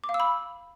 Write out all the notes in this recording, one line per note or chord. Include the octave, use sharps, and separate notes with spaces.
D6
F5
E6
B5